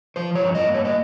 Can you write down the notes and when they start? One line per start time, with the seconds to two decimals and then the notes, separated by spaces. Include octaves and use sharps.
0.16 F3 C5
0.35 C#5
0.42 G2
0.55 D#5
0.68 A#3
0.74 C#5
0.85 D#5